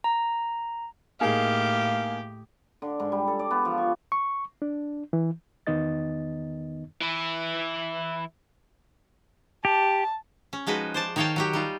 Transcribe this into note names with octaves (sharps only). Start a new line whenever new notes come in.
A#5
A2 A#3 D#4 G4 G#4 F5
D3
G#2
G3
A4
D5
B3
F3
C#6
C#6
D4
E3
E2 D#3 B3 D#4 D#5 A6
E3 E4
G4 A5
C#4
F3 G#3 D#4 F#4 B4
C5 D5 A5
D#3 D#4 C#5 F5 G5 A5
F#3 F#4 G4
G3 D#4 F4